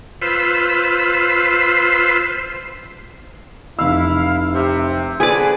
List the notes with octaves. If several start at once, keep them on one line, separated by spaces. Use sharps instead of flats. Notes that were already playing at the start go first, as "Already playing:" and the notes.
F4 B4 C5 E6
F1 E4 F5 E6
C3
D3 G#4 B4 D5 G#5